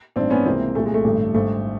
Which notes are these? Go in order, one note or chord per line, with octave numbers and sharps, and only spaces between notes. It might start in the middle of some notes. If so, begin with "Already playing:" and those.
A1 G2 D#3 C4 D4
B3 C#4
C#2 C3 E3 A#3 C4
C2 A#2 A3
G#3
A3
A1 G2 D3
G#1 G2 D3 A3